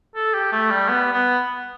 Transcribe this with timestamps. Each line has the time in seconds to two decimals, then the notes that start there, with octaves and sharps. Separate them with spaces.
0.16 A4
0.34 G4
0.52 A3
0.71 G3
0.89 B3
1.13 B3